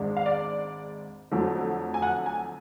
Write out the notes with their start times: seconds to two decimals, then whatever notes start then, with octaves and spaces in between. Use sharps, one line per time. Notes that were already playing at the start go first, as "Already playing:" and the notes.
Already playing: G#1 G#2 G#3 D4
0.17 F5
0.26 D5
1.31 F2 D3 F#3 A3
1.94 G#5
2.02 F#5
2.26 G#5